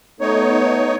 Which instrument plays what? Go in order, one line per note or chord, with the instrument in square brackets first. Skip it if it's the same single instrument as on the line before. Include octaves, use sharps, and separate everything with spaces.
[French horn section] A3 B3 [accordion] D#4 C#5